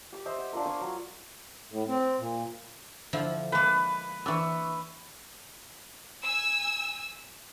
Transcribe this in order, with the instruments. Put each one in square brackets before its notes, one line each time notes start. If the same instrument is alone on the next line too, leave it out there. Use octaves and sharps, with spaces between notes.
[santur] G4 D6
C5 D#5 E5
F#5
D4 F4 A#4
G#5 C#6 D6
F#3
[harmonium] A2
C4
A#2
[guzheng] D3 F3 E4
[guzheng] G#3 A#3 [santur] B4
[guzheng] E3 D4 [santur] C#6 E6
[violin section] G#5 E6